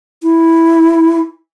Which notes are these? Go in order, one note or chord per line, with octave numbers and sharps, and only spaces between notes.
E4